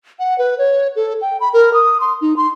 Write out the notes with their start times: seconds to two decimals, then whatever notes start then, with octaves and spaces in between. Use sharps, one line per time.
0.19 F#5
0.38 B4
0.58 C#5
0.96 A4
1.21 G5
1.40 B5
1.53 A#4
1.74 D#6
2.00 C6
2.21 D#4
2.36 C6